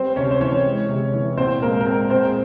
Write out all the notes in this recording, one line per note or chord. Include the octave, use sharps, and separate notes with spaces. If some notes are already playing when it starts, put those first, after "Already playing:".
Already playing: G3 C4 C5
C3 C#4 C#5
C5
E3 C#4 C#5
G#3
C3
E3
A#2 C4 C5
G#3 A#3 A#4
A#4
G#3 C4 C5
A#2 C4 C5
G#4